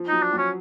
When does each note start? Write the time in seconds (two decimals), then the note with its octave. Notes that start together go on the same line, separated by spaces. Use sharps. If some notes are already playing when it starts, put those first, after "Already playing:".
Already playing: F3
0.08 F#3 D#4
0.22 D4
0.33 F#3 C#4